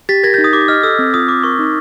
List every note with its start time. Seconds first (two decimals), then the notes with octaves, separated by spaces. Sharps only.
0.09 G4 A6 B6
0.24 A#4 G#6 A#6
0.34 G6 A6
0.38 D#4
0.44 D#6
0.53 G4 D6
0.68 D#5 F6
0.83 A4 E6
0.99 C4
1.14 F4 D#6
1.28 C4 D6
1.43 A#4 C#6
1.59 D#4